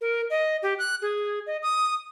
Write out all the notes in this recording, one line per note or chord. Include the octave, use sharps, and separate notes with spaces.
A#4
D#5
G4
F#6
G#4
D#5
D#6